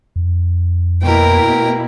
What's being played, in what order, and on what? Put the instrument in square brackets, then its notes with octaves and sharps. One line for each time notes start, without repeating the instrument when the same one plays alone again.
[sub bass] F2
[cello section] B2 A#3 E4 [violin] A#4 G5